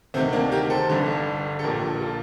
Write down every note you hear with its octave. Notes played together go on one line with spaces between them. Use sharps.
D2 C3 D#3 A3 C4
A#3 D4
G4 A#4
A4 C5
G1 G2 D3
A4
A#1 A#2 G4 A#4
F4 A4